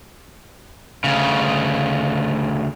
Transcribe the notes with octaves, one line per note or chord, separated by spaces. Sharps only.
D2 C#3